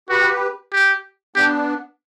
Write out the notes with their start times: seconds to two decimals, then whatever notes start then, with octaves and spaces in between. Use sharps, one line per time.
0.09 F#4 G4 B4
0.73 G4
1.36 B3 D4 G4